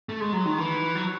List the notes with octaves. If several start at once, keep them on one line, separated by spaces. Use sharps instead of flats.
A3
G#3
F#3
D#3
E3
F#3